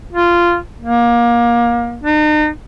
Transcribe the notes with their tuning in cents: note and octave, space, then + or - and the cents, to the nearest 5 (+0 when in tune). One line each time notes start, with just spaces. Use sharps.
F4 -10
A#3 +25
D#4 -40